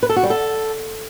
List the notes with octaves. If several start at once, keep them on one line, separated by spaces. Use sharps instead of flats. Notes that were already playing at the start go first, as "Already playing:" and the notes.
B4
A4
F#4
G3
A4